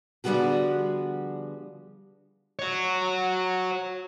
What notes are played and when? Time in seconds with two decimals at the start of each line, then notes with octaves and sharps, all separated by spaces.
0.24 D3 F3 G3 B3 F#4 G#4
2.59 F#4 C#5